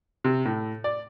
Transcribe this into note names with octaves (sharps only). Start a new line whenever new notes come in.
C3
A2
D5